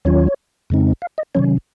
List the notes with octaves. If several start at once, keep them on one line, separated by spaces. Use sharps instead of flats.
D#2 D#3 F#3 C#4 F4 C#5
F2 C#3 G#3 C4 D#4
F5
D#5
C3 D#3 F#3 C#4 C#5